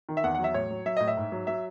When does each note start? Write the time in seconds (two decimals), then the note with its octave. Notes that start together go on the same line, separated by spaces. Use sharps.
0.09 D#3
0.17 E5
0.24 E2 F#5
0.35 F#3 F#5
0.44 E5
0.54 A2 C#5
0.70 F#3
0.86 F#3 E5
0.97 A2 D#5
1.08 E5
1.17 G#2
1.32 F#3
1.47 F#3 E5